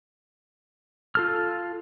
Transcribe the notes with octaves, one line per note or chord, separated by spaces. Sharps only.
F4 A4 F6